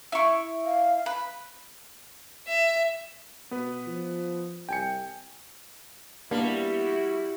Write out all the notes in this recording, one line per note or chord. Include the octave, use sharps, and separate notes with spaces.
E4 C#6
F5
B4
E5
B2 B3 B4
F3
C2 G5 G#5 C#7
G3 A#3 B3 D4 E4 F#4